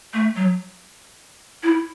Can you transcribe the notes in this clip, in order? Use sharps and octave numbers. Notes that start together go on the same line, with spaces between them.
A3
F#3
E4